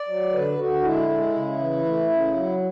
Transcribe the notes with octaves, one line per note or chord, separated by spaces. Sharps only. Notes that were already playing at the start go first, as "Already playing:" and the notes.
Already playing: D5
F#3
D3 B4
D3 F#4
G#3 E4
G#3
C#3
E3
A3
C#3
F#3